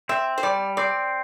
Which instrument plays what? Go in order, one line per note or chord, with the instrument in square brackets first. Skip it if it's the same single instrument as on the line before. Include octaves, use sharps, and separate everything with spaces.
[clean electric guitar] C4 [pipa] E5
[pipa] C5
[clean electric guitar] G3 [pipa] D5
[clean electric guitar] C4 [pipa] D5